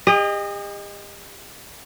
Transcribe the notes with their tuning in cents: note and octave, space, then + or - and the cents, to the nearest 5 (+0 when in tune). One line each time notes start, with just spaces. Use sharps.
G4 +45 D#5 -15